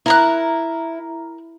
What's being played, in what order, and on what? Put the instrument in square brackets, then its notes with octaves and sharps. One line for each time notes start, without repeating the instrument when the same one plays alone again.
[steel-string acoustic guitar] E4 [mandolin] A#4 A#5 F#6